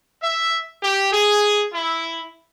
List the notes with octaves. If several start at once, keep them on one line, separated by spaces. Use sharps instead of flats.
E5
G4
G#4
E4